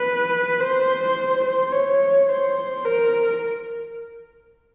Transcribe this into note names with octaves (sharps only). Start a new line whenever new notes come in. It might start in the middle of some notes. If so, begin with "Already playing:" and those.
Already playing: B4
C5
C5
C#5
C5
A#4